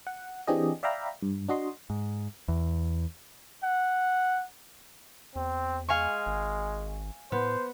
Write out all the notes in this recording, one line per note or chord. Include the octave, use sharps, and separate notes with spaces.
F#5
E3 C4 D4 G4 G#4 D#5
D5 E5 F5 G5 A#5 B5
G2
D4 F#4 D#5 C6
G#2
E2
F#5
E2 C4
G#3 F5 G#5 C#6
G#1
A2 B3 C5